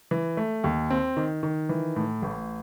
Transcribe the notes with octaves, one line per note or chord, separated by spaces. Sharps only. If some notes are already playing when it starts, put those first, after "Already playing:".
E3
A3
D#2
C4
D#3
D#3
E3
A2
A1